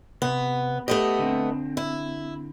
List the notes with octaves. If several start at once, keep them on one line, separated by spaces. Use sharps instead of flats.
C3 B3
A3 B3 G4 A4 D#5
D3 C4
E4